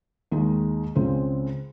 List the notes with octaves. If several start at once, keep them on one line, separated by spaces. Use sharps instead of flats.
D#2 D#3 G#3 D#4
C#2 C#3 G#3 C4